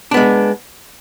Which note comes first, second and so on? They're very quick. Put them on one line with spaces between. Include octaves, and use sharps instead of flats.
D4 B3 G#3